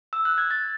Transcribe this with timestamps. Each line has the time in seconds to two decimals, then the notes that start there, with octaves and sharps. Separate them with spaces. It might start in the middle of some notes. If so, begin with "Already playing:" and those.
0.13 E6
0.25 F#6
0.38 G#6
0.51 A6